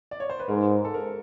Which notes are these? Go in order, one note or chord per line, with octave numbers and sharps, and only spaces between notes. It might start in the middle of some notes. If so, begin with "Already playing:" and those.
D5
C#5
C5
B4
G#2 A#4
A4
A#4